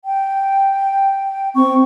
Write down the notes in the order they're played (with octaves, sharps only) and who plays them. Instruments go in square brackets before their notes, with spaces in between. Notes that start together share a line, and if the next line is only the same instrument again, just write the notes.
[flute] G5
[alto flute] C4 [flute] C#6